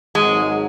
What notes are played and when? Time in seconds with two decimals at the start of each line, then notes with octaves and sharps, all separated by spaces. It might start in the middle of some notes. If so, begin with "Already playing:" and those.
0.15 G#1 G#2 F#3 G#3